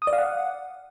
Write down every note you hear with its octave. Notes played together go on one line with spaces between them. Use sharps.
D#6
D5
F5
F#5